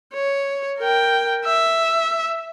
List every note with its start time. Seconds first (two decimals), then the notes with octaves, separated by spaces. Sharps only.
0.14 C#5
0.79 A#4 G5
1.45 E5